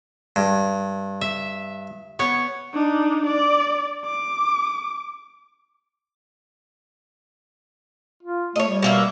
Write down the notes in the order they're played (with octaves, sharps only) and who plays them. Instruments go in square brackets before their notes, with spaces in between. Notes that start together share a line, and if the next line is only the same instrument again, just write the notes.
[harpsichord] G2
[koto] E5
B3 C#5
[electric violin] D4 D#4
D5
D6
[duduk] F4
[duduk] A3 [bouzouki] C#5 D#5
[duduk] G3
[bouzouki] B2 A#3 E5